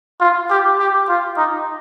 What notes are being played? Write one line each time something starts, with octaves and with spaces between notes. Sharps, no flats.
F4
G4
G4
F4
D#4